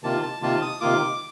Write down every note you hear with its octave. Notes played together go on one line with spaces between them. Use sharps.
C3 D#3 A#3 F4 A5
A5
C3 D#3 A#3 F4 A5
D#6
C3 D#3 A#3 F4 D6